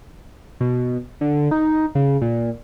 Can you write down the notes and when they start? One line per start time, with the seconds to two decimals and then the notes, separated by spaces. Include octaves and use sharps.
0.60 B2
1.21 D3
1.51 D#4
1.95 C#3
2.21 A#2